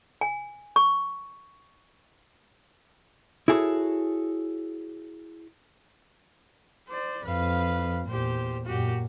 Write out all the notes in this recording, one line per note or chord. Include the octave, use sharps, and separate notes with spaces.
G#5
C#6
E4 F#4 G#4 A4 C#5
C5 D5
F2 B4 F5
E2 A#2 G4 C5
F#2 A#2 F#4 G4